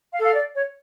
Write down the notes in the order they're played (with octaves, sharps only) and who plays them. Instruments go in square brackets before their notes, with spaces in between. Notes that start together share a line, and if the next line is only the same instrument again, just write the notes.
[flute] F5
[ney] A4
[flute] F5
D5
C#5